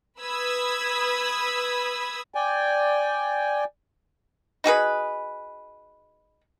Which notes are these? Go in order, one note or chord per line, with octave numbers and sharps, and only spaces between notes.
B4 B5 D#6 E6 G#6
D5 G5 G#5
D#4 F#4 G#4 B4